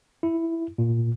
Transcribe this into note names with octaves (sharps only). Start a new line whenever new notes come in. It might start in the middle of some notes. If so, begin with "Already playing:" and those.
E4
A#2